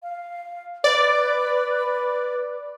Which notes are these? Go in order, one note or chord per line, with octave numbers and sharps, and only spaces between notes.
F5
B4 D5